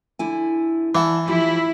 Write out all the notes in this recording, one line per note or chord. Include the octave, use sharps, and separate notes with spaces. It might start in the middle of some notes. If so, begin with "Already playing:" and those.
D3 E4 G#5
E3 D5 F#5 A5
F3 E4 F4 G4